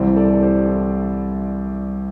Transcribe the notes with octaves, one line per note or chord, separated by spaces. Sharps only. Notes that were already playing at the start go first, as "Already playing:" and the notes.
Already playing: C2 C3 E3 G3 C4
A4 D5
A4
G4 C5
E4 A4